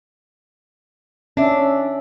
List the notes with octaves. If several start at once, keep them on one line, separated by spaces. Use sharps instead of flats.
C#4 D4 E5